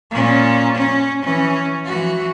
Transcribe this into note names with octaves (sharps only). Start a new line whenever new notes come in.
A#2 C#4
C#4
E3 C#4
E3 F#4